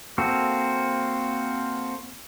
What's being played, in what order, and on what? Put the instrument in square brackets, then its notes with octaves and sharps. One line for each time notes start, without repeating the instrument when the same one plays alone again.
[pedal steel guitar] A#3 C4 F#4 A4